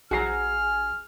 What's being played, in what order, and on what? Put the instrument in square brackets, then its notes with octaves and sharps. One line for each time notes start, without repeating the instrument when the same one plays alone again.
[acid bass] A#1 [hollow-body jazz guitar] F#4 F#5 A#5 [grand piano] G#4 G#5 C7 [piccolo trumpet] F6